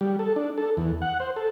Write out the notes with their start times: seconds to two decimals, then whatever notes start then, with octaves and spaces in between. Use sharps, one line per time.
0.01 G3
0.19 A4
0.36 D4
0.58 A4
0.77 E2
1.02 F#5
1.20 C5
1.36 A4